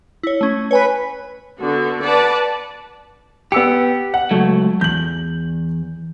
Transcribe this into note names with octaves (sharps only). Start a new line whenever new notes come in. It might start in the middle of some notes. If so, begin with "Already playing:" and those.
E4 C#5
A3 C#4
B4 C#5 G#5 B5
D3 B3 F#4
B4 D5 F#5 A5
B3 G4 E6 C#7
F#5
C#2 F#3 A3
E2 G6 F#7